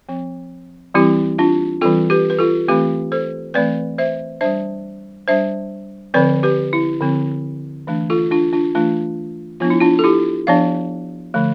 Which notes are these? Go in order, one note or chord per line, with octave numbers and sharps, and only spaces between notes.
F3 C4
E3 G3 C4 E4 G4
D4 F4
E3 G3 C4 F4 A4
G4 B4
B4
F4 A4
E3 A3 C4 G4 B4
A4 C5
E3 A3 C4 B4 D5
C5 E5
G3 D4 C5 E5
G3 D4 C5 E5
D3 F3 C4 B4 D5
G4 B4
E4
D3 F3 C4
E3 A3 D4
F4 A4
D4 F4
D4 F4
E3 A3 D4 F4
F3 B3 D4 F4
E4
D4 F4
A4
E4 G4
F3 B3 D4 D5 F5
D3 F3 A3